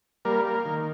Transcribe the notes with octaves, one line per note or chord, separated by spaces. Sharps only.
G3 A#3 A#4
A#3
D#3